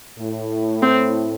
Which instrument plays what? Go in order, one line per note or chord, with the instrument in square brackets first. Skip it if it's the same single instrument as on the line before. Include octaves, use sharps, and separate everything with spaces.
[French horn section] A2
[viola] C4